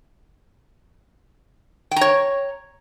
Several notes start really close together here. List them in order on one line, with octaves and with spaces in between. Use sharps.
G5 A#5 C#5